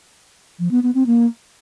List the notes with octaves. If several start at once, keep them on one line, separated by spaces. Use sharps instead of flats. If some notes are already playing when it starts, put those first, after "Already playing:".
F3
B3
B3
C4
A#3